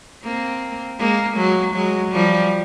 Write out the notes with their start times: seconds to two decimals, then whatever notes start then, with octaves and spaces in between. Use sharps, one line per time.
0.23 A#3 C4
0.99 G#3 A#3
1.37 F#3 G#3
1.74 F#3 G#3
2.12 F3 G3